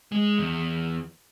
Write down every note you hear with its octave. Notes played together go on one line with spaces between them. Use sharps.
G#3
E2